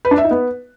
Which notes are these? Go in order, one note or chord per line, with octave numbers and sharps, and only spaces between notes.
B4
D4
E5
D#4
B3